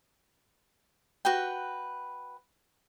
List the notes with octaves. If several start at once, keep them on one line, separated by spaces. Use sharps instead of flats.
F#4 B4 G5